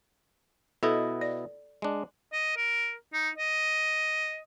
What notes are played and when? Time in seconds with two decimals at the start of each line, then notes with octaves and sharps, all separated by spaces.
0.83 B2 E4 A4 D#5
1.21 D5
1.82 G#3 D4
2.33 D#5
2.57 A#4
3.13 D#4
3.38 D#5